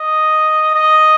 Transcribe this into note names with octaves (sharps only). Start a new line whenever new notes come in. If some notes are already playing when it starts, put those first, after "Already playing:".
Already playing: D#5
D#5